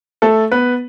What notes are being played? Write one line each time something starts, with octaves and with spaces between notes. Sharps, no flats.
A3 A4
B3 B4